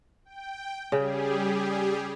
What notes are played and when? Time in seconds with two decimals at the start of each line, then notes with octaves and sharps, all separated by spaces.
0.25 G5
0.92 C#3 G3 G4 G#4